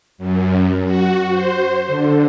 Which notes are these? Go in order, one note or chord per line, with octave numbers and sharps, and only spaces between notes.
F#2
F#4
C5
D3